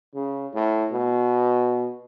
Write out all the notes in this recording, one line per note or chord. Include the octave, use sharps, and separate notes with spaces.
C#3
A2
B2